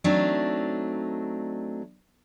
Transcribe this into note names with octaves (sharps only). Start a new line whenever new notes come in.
F#3 A3 C4 D4 D#4